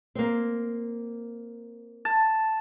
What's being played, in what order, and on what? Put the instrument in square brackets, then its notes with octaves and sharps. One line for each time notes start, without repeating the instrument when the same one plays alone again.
[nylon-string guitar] A#3 C4
[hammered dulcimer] A5